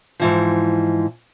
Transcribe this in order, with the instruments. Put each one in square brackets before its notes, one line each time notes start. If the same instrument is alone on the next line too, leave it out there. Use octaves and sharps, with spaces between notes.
[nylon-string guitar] G#2 E3 F3